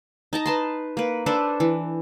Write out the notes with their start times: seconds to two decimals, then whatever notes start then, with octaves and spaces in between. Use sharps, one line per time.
0.33 D#4 A5 A#5
0.46 B4 A5 C6
0.97 A#3 B4
1.26 D4 A4 B4 C5
1.60 E3